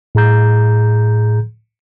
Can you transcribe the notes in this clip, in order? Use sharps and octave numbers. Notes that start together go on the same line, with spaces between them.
A2 G#4 A#5 G6